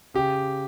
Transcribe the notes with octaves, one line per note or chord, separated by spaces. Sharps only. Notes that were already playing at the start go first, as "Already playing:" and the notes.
C#3 G4